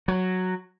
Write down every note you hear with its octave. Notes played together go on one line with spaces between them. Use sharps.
F#3